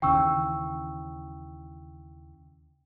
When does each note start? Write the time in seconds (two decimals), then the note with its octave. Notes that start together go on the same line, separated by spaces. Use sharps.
0.02 D#2 C#3 E3 G5 C#6 E6